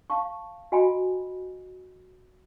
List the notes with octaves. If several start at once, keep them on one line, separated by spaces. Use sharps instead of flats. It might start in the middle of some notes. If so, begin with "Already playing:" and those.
F5 A5 C#6
F#4 D#5 G5 G#5 A#5 B5